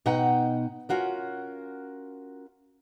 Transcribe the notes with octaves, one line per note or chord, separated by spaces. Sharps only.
B2 D#4 F#5 G5 A#5
C#4 F4 F#4 A#4